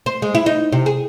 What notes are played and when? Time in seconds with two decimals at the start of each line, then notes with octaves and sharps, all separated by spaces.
0.06 C5
0.22 G#3
0.35 E4
0.46 D#4
0.72 C3
0.86 G#4